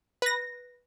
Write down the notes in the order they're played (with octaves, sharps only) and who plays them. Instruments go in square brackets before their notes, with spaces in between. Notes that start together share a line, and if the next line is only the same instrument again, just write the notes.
[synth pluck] B4 A#6